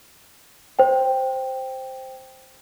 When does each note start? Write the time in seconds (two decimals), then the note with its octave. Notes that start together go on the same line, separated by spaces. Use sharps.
0.79 C5 G5